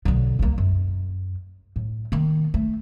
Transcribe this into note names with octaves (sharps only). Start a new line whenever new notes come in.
B1 D3
C2 A#3
F#2
A2
D#3 A#3
A3